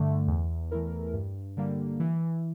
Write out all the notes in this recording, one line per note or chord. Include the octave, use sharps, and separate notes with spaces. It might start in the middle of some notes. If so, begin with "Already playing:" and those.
Already playing: G2 D3 A3
E2
E3 A3 E4 A#4
G2
D3 G3 A#3
E3